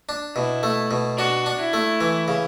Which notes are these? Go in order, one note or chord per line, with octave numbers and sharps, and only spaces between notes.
D4
B2 E4
A3
B2
D4 F#4
D4
E4
A3
E3
C#3